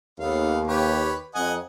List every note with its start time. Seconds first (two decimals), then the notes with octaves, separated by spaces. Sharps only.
0.20 D#2 A3 B3 F5
0.67 G4 B4 C#5
1.35 F2 D#5 F#5 G#5